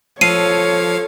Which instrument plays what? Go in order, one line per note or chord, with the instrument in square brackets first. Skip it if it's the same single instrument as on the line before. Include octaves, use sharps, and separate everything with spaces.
[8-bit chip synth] F3 F5 [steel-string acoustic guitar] A4 [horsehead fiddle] C#5 [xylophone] C7 D#7